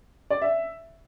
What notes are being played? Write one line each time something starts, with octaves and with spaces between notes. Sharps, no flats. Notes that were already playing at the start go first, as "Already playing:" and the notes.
D5
E5